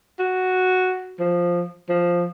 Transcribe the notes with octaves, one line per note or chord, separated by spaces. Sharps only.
F#4
F3
F3